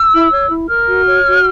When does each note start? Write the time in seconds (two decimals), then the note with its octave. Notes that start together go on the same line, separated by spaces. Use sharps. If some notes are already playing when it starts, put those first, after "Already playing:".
Already playing: E6
0.12 E4
0.31 C#5
0.49 E4
0.68 A#4 F6
0.88 F#4
1.07 C#5
1.25 F#4